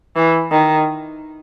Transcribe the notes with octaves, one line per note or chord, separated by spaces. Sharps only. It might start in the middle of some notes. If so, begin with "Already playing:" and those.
E3
D#3